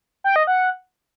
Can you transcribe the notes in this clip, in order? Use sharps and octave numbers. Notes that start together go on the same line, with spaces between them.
G5
D#5
F#5